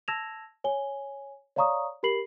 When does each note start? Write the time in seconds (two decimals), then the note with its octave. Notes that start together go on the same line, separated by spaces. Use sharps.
0.08 A5 E6 G#6 A#6 E7 F7
0.64 C#5 G#5 G7
1.56 C#5 D5 F5 A#5 C#6 D#6
2.03 G4 A#4 B5 C7 F#7